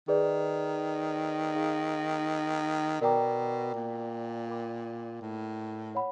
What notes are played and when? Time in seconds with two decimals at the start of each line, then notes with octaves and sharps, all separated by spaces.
0.08 D#3 G#4 B4 D5
1.55 D#4 G#4 C5 F5 A#5
3.01 B2 A#4 D5 G5 A#5 D6
3.74 A#2
4.49 A#4 D5 G5 B5 D6
5.21 A2
5.95 C#5 F#5 B5